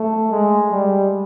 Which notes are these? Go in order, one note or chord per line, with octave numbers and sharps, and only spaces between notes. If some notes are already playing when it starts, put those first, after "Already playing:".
Already playing: A3
G#3
G3